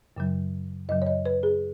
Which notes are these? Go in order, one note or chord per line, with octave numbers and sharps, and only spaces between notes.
F#2 C#3 F#3
F#2 C#3 F#3 D#5
C#5
D#5
B4
G#4